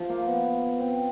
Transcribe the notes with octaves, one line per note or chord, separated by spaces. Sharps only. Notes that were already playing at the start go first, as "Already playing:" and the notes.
Already playing: F3
A#3
A#3
B3
C4